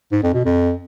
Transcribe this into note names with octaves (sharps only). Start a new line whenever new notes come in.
G#2
F2
B2
F2